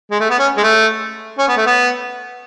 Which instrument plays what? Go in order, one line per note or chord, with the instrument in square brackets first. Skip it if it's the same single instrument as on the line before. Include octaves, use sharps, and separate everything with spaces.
[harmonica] G#3
A3
B3
C#4
G#3
A3
C#4
B3
A3
B3